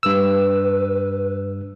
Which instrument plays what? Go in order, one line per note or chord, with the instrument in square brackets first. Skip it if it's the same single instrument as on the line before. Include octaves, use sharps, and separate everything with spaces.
[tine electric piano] G2 E6 [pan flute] B4